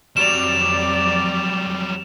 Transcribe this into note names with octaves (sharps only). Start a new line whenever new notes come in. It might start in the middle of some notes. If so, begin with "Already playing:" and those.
F2 F#3 G3 D5 E7 F7